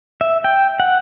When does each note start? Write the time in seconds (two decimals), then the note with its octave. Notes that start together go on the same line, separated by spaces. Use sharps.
0.21 E5
0.44 G5
0.80 F#5